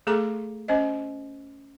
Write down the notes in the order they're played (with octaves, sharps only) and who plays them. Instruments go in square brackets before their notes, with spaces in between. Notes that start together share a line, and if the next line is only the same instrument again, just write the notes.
[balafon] A3 G#4 A4 A#5 D6
C#4 C5 D#5